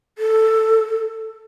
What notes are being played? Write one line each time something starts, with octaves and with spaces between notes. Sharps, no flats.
A4